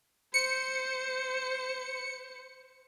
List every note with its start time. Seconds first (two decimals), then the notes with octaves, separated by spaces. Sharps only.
0.34 C5 C#7